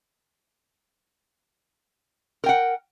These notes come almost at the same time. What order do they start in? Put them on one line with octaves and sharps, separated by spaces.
A#4 G5 F#5